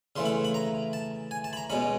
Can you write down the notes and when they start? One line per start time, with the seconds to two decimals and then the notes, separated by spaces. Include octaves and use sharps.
0.16 C#3 E3 A3 C6
0.25 B5
0.45 B5
0.54 A#5
0.93 A5
1.31 G#5
1.44 A5
1.53 B5
1.57 A#5
1.70 B2 G#3 C#4 B5